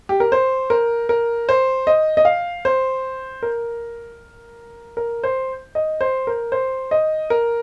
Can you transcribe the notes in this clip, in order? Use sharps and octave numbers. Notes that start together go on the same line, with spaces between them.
G4
A#4
C5
A#4
A#4
C5
D#5
D#5
F5
C5
A#4
A#4
C5
D#5
C5
A#4
C5
D#5
A#4